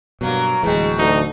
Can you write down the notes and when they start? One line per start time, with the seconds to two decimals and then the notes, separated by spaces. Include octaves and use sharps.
0.21 G2 B2 F#3 A#3
0.63 D1 B2 E3 G#3 C4
0.98 D2 D#4